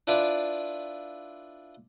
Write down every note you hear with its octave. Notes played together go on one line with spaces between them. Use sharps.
D4 E4 F4 B4 D5 E5